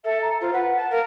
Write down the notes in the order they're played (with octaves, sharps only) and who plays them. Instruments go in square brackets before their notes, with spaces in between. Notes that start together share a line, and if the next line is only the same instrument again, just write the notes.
[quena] A4 [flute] E5
[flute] A#5
[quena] F4 [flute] C5
[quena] B4 [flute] F#5
[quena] A5
[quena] A#4 [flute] F5